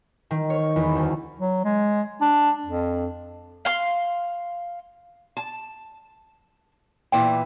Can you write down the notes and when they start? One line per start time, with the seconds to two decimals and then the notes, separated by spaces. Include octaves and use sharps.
0.31 D#3
0.50 C#5
0.76 E2
0.95 D2
1.40 F#3
1.65 G#3
2.21 D4
2.66 F2
3.65 F5 C6
5.37 A5
7.12 A#2 E3 G5